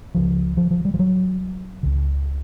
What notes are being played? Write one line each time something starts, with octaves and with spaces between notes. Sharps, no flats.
C#2 C#3 F3
F3
F3
G3
F3
F#3
C#2 C#3